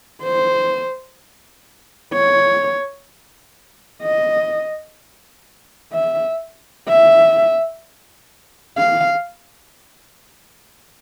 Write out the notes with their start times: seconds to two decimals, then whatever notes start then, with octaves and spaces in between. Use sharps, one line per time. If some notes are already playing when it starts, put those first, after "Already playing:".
0.23 C5
2.14 C#5
4.03 D#5
5.93 E5
6.88 E5
8.78 F5